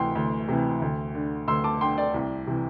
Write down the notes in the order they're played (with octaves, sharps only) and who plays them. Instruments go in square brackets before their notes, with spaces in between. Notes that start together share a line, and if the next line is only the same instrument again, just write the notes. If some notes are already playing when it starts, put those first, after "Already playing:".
Already playing: [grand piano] D2 C3 E3 G5 C6
D2
C3 E3
D2
D3
D2 C6 E6
A5 D6
D3 G5 C6
D5 G5
C2
C3 E3